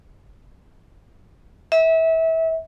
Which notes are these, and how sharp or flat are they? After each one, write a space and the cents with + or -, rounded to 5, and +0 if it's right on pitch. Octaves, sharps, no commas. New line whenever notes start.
E5 -25